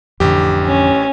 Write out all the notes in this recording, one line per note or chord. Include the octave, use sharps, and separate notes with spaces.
A1 F2 D3 G4
C#4